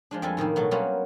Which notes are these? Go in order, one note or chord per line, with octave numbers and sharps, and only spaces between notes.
F3 G#3 D4
F2 G3 G#3 A4 G#5
A2 D#3 G3 A#3
B2 F#3 A3
F#3 G3 A#3 B3 C#4 F4